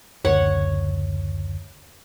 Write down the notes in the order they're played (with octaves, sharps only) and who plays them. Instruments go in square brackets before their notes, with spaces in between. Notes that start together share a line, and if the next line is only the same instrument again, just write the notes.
[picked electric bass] F#1 D2 [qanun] C#5 F#5